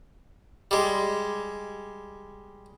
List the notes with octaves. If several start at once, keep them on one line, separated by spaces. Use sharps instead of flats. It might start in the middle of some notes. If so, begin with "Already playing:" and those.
G3 G#3